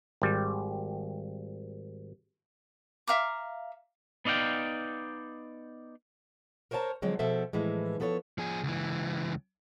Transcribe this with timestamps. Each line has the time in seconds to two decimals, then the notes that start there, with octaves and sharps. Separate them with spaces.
0.22 G#1 G3
3.07 E5 F5 A#5 D6
4.25 B3 D#4 D5 F5 G5
6.71 A#4 C5 C#5 G5 A5 A#5
7.02 D3 F3 F#3 G#3 C4
7.19 B2 F3 A4 C5 E5 F#5
7.53 A2 E3 F3 G#3
8.00 F3 B3 A4 B4 C#5
8.38 F3 G#4
8.63 C#2 E3